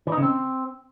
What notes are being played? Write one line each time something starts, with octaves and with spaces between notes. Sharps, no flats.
E3
D#4
C#3
C4